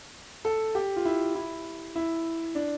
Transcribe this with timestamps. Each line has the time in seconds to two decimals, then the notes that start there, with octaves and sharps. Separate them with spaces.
0.45 A4
0.75 G4
0.96 F4
1.05 E4
1.35 E4
1.95 E4
2.55 D4